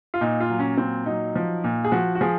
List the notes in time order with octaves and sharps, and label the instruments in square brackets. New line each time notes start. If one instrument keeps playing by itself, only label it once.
[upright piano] F4
A#2 D#4
F4
F#3
C#4
A#2 C4
F#3 D#4
F3
A#2
G#4
F3 F#4
F#4
F3 G#4